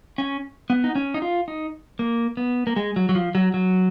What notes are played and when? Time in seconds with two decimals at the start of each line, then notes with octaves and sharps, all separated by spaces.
0.18 C#4
0.70 B3
0.84 D#4
0.95 C#4
1.14 D#4
1.22 F4
1.48 D#4
1.99 A#3
2.37 B3
2.67 A#3
2.76 G#3
2.96 F#3
3.09 F#3
3.15 F3
3.35 F#3
3.54 F#3